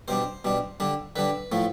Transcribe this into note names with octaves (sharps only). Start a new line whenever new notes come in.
B2 G3 D4 C5
B2 G3 D4
D3 G3 D4
D3 G3 D4 B4
A2 F3 A3